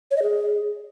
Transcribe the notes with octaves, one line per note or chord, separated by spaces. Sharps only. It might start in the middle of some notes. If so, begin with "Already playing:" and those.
C#5
D#5
G#4